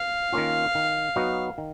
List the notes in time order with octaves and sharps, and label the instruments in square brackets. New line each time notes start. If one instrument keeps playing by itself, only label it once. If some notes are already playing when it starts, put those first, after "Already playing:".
Already playing: [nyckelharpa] F5
[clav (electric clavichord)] D#3 A#3 C#4 F4
D#3
F#3 B3 D#4 F#4
D#3